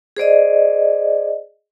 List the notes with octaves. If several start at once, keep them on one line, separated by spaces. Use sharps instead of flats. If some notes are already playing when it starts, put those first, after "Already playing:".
G#4 C5 D5 D#5